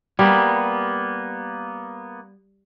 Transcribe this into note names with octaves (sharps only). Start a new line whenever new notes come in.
G3 A#3 B3